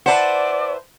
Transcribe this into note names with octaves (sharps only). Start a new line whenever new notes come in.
E4 B4 C5 D5 F#5 A5